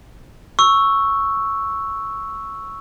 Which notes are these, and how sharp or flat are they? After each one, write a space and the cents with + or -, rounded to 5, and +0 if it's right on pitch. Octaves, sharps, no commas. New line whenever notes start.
C#6 +0 E6 +0